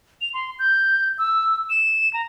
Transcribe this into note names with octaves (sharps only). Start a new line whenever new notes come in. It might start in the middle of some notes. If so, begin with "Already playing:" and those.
F7
C6
G6
E6
E7
A#5